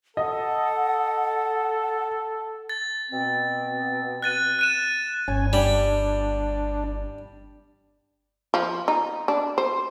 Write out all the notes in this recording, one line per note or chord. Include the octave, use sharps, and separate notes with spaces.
A4 D#5 F#5
A6
B2 C4
F#6 A6 D#7
F#6 D#7 E7
G1 C#4 G#5
G3 D4
F3
D#4
D4
C5